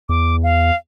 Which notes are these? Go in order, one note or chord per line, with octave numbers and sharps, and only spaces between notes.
E2 D6
F5